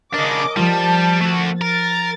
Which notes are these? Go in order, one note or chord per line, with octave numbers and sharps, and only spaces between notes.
C#3 D4 A#4 D#5 D6
F3 G3 F4 A5
A3 F#4
A#4 A6